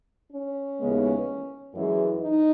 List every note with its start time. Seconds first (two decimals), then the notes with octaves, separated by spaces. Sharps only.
0.32 C#4
0.79 D#2 C#3 E3 G#3 B3
1.74 F#2 E3 G#3
2.21 D#4